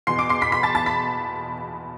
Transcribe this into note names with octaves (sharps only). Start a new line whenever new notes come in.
E2 B2 C6 C7
D6 D7
C6 C7
B5 B6
B5 B6
A5 A6
A5 A6
B5 B6